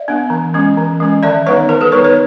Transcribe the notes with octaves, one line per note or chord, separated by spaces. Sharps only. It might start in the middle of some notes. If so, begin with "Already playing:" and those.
Already playing: D5 E5
B3 D4
E3
G#3 C#4
E3
G#3 C#4
D#3 D5 E5
G3 B3 D#4 B4 C#5
D#3 A#4 C5
A4 B4
G3 B3 D#4 B4 C#5
B4 C#5